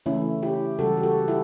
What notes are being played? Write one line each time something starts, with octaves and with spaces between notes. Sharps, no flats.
C#3 E3 A3 C#4 E4
E4 G4
C#3 E3 G3 F#4 A4
G4
F#4 A4
E4 G4